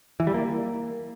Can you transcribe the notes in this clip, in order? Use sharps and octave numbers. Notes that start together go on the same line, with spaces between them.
E3
G3
A#3